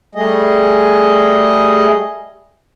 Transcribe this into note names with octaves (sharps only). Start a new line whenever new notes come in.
G3 A3 G#4 D#5